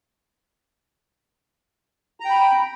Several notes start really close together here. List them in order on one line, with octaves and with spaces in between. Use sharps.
A#5 G5 B5